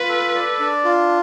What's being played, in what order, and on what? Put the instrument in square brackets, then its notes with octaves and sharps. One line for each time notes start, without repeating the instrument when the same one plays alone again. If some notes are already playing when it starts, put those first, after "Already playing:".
Already playing: [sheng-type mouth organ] F4 [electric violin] B4
[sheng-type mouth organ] A4
D5
D4
F4